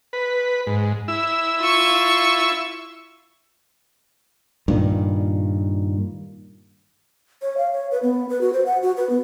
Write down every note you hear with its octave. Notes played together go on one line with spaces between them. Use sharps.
B4
G#2
E4 E6
F4 C#6
G2 A#2 D#3
C#5
F5
C#5
B4
B3
B4
F#4
C5
F#5
F#4
B4
B3